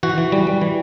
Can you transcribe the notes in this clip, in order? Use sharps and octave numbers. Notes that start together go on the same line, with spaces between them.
E3 F#4
E3
G3
G3
E3